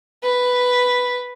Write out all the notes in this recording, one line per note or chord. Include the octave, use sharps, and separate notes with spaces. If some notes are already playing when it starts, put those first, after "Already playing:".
B4